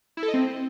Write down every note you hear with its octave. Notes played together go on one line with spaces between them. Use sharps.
E4
A4
D#5
C4